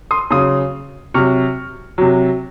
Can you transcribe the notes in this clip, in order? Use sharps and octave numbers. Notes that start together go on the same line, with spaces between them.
C6 D#6
C#3 F#3 C6 D#6
C3 F#3 C#6 F6
C3 F#3